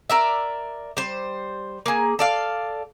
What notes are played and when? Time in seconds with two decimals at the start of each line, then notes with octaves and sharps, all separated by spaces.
0.10 A#4 D5 E5
0.97 G3 C5
1.86 A#3 G#4
2.19 A4 D5 F5